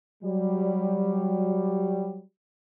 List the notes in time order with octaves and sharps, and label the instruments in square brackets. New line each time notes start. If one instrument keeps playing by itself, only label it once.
[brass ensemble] F#3 G3